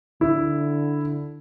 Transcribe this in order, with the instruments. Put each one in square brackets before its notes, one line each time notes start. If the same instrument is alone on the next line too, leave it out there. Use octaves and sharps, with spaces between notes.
[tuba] D3 [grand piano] E4